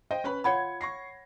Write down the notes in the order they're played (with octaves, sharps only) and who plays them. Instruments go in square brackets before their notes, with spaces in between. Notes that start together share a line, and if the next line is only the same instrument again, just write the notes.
[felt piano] C5 D#5 G5
C#4 B4 B5
[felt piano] F4 G#6 C#7 [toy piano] C#5 F#5 B5
[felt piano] C#6 A#6 C7